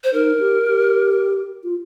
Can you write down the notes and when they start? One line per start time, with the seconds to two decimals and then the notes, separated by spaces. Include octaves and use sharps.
0.04 C5
0.13 D#4 A#4
0.40 G4
0.67 G4
1.64 F4